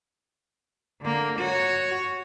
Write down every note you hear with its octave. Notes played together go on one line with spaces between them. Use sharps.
D3 A#3
F#4 C#5